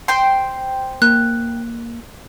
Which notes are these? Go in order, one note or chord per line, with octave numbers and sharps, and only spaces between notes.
C5 G5 C6
A#3 F#6